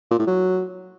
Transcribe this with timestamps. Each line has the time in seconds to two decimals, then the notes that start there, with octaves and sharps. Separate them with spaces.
0.11 A#2
0.19 A2
0.27 F#3